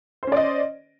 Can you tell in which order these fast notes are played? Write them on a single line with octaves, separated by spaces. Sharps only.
C5 C#4 D5 D#5